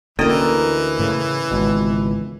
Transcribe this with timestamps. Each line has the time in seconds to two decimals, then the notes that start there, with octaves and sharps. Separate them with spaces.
0.19 D2 D3 E3 A#3 C#4 E4 A#4 D#5
0.99 A2 C#3 A3
1.51 G#1 C#2 B2